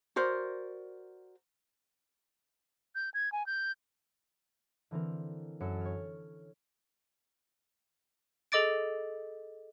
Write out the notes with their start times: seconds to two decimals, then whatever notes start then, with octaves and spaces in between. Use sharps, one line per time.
0.16 F#4 A#4 C5 D5
2.95 G6
3.14 G#6
3.32 G#5
3.46 G6
4.91 D3 E3 C4 A#4
5.60 F#2 A4 C#7 E7
5.81 C#5 F6
8.52 G#4 A4 D#5 D6 A6 D7